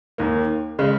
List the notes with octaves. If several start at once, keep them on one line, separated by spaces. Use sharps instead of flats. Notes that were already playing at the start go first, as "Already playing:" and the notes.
D#2 D#3 A#3
C#3 G#3